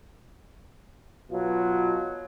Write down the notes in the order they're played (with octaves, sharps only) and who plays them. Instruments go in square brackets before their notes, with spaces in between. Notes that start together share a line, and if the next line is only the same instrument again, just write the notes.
[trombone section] B2 F#3 F4